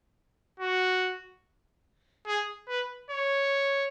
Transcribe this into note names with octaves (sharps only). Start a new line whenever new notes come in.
F#4
G#4
B4
C#5